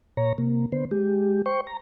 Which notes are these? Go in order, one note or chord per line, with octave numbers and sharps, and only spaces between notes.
A#2 C#5 A#5
C3 A#3
D3 B3 C5
G#3 G4
C5 G5 C#6
A#5